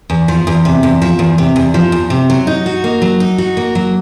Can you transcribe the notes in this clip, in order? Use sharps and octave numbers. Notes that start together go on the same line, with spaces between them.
E2
F3
E2
C3
E2
F3
E2
C3
E2
F3
E2
C3
F#3
D#4
F#4
A#3
F#3
D#4
F#4
A#3
F#3